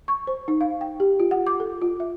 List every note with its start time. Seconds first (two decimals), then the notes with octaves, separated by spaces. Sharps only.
0.08 C#6
0.27 C5
0.48 D#4
0.61 F5
0.81 G5
1.00 G4
1.20 F4
1.31 F#5
1.47 D6
1.60 A4
1.82 F4
2.00 E5